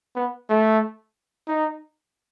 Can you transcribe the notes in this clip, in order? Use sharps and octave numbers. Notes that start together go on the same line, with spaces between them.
B3
A3
D#4